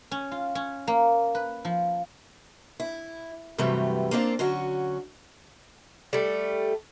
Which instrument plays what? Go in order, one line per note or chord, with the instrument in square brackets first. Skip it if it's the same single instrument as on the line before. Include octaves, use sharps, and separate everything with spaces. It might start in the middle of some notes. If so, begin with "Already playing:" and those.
[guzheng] C#4
F4
C#4
A#3
B4
F3
[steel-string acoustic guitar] E4
G2 C3 E3 F#3 G3 A3
A#3 C4 D4 F4
D3 F#3 C#4 F#4
[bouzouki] G3 A3